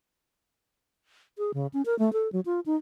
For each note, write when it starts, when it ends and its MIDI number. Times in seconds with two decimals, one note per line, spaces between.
1.38 1.52 68
1.54 1.67 49
1.73 1.82 61
1.86 1.97 70
1.99 2.13 57
2.13 2.31 69
2.33 2.40 54
2.46 2.60 65
2.66 2.76 63